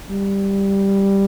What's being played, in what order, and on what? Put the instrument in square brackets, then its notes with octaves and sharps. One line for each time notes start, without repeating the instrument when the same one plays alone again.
[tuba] G3